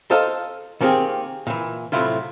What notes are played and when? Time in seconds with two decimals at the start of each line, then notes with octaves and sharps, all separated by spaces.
0.11 A4 C5 D#5 F5 A5 A#5
0.81 D#3 A#3 C4 G4 G#4
1.47 A#2 E3
1.92 A2 C3 F#3 E4 F4